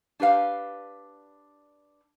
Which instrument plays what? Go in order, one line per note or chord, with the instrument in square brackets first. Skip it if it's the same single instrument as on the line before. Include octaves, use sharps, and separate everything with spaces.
[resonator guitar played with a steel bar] D4 G4 B4 F5